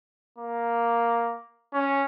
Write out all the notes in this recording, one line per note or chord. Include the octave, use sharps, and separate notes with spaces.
A#3
C#4